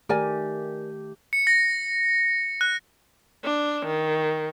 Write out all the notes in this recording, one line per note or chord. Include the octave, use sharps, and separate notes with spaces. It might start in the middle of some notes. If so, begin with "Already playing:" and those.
D#3 A3 G4 A#4 D5 G#5
C#7
A#6
F#6
D4
D#3